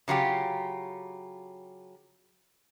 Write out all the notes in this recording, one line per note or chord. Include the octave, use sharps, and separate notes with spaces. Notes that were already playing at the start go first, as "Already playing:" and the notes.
C#3 F#3 F4 G4